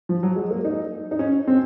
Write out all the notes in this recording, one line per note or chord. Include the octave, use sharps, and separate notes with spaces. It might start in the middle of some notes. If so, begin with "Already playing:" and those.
F3
F#3
G#3
A#3
D#4
D#4
C#4
C4